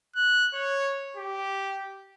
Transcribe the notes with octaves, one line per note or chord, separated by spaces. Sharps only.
F#6
C#5
G4